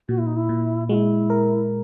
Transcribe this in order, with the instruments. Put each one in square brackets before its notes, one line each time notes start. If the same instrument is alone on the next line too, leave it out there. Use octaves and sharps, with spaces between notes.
[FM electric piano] A#2 [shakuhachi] F#4
[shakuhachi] E4
D#4
E4
[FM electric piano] A#2
[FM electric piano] G#3 [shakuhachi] E4 F#4
[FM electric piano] A#4